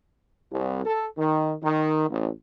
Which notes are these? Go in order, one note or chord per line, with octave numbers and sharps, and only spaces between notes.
C2
A4
D#3
D#3
A1